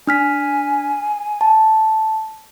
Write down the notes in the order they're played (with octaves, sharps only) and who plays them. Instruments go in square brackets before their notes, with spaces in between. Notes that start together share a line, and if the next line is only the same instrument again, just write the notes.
[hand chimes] D4 F6 B6 [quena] G#5
[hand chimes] A5